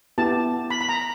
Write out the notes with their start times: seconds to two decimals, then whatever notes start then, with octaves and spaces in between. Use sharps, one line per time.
0.18 B3 E4 G4 A5
0.70 B5
0.81 B5
0.89 A#5